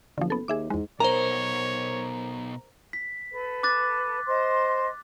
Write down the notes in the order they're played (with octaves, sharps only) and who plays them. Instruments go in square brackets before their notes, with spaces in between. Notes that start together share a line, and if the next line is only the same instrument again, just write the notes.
[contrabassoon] F#1 [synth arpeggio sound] D3 F3
[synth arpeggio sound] B3 A4
[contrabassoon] D#2 [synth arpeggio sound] G#4 E5 D6
[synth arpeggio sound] E2 G#3 [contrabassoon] G#2
[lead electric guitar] B2 D#4 [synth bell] A#4 C5 [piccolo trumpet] C#5 [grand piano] A#5
[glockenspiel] B6
[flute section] A4 B4
[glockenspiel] D6 F#6 A6
[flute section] C5 D#5 C6